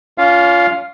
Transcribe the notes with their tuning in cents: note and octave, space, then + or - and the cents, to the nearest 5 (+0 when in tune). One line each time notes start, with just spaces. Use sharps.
C#4 +35 F4 +0 F5 +0